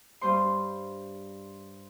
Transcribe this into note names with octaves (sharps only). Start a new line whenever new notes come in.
G2 C5 C6